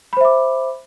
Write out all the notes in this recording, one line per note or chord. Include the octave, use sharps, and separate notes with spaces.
C5 E5 B5 D6